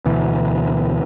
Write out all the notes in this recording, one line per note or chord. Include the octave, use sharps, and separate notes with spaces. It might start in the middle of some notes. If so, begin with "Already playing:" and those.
D2 B2 E3